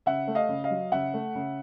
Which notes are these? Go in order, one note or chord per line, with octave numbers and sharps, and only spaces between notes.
C#3 E5 F#5
A3
D#5 F5
C#3
D#5 F5
F#3
C#3 E5 F#5
A3
C#3